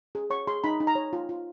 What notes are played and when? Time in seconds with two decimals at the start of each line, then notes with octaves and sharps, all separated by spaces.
0.15 G#4
0.30 C#5 C#6
0.47 G#4 C6
0.64 D#4 B5
0.80 D#4
0.87 A#5
0.95 C#5
1.13 F4
1.29 F4